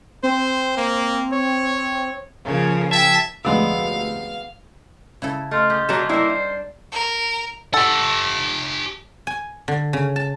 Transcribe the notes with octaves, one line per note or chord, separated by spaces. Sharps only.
C4 C5
A#3
C#5
C#3 F3 A#3 C#5
E5 G5 A5 G#6
F1 D2 G#3 B3 D5 F5 E6
C#3 E4 A4 G#6
A3 D#5 F5 C6 F6
G4 G#4
F#3 A#3 G#4 A4 E5 A5
G3 A#3 D#4 E4 C5
D4
A#4
G4 A4 F#5
G#5
D3
C#3
A5